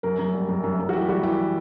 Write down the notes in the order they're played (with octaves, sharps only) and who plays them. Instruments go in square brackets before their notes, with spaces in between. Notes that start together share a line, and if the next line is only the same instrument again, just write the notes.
[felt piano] F#2 A#4
F#2
G3
F#2
F#2
F#2
F#4
E3 G4
G3 F#4
E3 G4